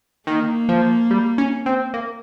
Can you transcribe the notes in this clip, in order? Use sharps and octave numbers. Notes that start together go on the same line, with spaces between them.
D#3 A#3
F3
G3
C#4
C4
A#3